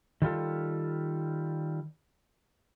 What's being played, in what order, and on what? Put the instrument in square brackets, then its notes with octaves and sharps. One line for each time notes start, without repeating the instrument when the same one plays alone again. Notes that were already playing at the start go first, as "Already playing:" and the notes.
[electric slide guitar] D#3 G3 F4 A4